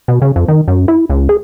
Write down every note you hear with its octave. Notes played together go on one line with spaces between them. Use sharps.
B2
C#3
F2
D#3
F#2
E4
C#2
G#4